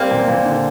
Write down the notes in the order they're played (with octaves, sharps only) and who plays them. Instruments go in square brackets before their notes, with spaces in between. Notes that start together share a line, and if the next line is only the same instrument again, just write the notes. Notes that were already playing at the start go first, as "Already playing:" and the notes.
Already playing: [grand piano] G3 [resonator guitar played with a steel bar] A#3 C4
[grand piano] A#2
A#2
D3